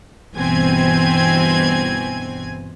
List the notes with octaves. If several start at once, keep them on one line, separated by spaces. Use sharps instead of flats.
G1 B2 E3 C4 G#5 G#6